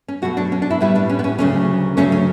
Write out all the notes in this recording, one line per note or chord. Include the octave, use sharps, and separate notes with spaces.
C#4
B2 F#3 A3 F#4
D4
C#4
D4
E4
A2 G3 B3 E4
D4
C#4
B3
C#4
D2 C#3 F#3 A3 C#4
D2 C#3 F#3 A3 C#4
C#4